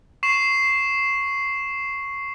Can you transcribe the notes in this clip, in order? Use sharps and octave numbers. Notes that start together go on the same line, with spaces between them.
C#6 C7 E7 F#7